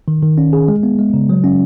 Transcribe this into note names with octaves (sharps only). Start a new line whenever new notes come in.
D#3
D#3
C#4
G#4
G#3
B3
G#3
C#3
F#3
C#4